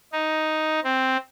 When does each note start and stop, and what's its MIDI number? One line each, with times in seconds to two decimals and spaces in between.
0.13 0.80 63
0.84 1.17 60